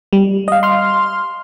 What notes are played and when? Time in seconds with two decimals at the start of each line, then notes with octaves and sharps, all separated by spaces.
0.13 G3
0.48 D#5 F5
0.63 C6 F6